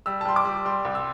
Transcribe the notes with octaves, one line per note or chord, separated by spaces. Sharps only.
G3 E6
A5
G3 C6
D6
G3
G3 C6
C2
E6